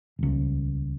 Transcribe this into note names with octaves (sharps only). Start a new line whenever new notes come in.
D#1 C#2